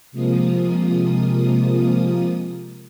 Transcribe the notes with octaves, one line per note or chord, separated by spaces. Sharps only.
C3 F3 G#3 A#3 F4 D#6